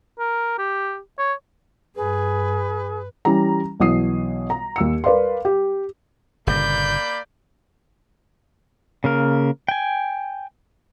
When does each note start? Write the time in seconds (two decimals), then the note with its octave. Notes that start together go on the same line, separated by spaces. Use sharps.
0.19 A#4
0.58 G4
1.18 C#5
1.96 G2 G#4 B4
3.25 E3 G3 C#4 A#5
3.80 B1 B2 E3 D#6 C7
4.50 A#5
4.76 D#2 E6 C#7
5.04 A#4 B4 D5 F5 C6
5.45 G4
6.47 G1 A#2 C#3 A#3 D5 B5 G6
9.04 C#3 A#3 A#4
9.68 G5 G#5